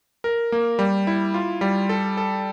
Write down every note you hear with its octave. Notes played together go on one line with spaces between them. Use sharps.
A#4
A#3
G3
E4
F4
G3
A4
A4